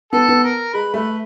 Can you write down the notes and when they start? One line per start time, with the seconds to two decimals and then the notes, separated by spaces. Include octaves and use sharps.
0.13 B3 A4
0.29 B3
0.43 A#4
0.73 G#3 B4
0.94 A3 B4